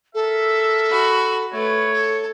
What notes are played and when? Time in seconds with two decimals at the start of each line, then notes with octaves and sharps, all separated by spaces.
0.14 A4 A#4 E5
0.90 F#4 B5
1.53 A3 B4 C#5
1.93 A4